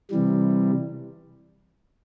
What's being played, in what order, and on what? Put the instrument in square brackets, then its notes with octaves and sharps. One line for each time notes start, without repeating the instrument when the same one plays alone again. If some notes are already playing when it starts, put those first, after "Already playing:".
[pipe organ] C3 E3 G3